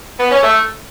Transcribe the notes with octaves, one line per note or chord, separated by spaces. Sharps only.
B3
C#4
A3